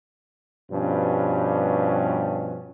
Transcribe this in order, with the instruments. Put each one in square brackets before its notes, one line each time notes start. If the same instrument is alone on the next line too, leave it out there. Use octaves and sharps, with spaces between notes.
[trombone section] G2 B2 F3 G3 C#4